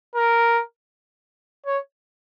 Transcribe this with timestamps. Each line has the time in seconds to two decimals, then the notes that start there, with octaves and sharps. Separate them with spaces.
0.15 A#4
1.66 C#5